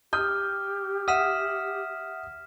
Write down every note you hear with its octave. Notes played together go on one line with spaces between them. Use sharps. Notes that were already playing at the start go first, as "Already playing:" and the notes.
G4 D#6 F6 G6
E5 F#5 D#6 F6 B6 E7